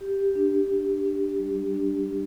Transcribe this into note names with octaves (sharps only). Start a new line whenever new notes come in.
G4
D4
D4
D4
G3
D4
D4